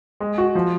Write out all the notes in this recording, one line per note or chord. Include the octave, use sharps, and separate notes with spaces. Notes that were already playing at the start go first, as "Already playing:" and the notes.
G#3
F#4
F3